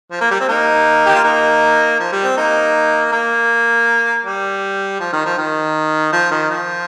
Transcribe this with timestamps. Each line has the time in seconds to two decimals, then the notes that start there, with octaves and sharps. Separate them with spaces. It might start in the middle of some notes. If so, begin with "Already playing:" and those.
0.11 F3
0.21 A#3
0.31 G3
0.40 C4
0.49 A#3 D#4
1.06 G4
1.15 F4
1.24 A#3 D#4
2.00 F3
2.12 G3
2.24 C4
2.37 A#3 D#4
3.12 A#3
4.25 G3
5.00 F3
5.13 D#3
5.25 F3
5.38 D#3
6.12 F3
6.31 D#3
6.50 F3